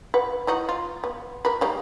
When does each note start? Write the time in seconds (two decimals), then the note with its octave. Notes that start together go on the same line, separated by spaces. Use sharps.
0.14 B4 F#5
0.47 E3 D#4 F#4
0.69 F4
1.04 B3
1.45 A#4 B4
1.61 G3 A#3 D#4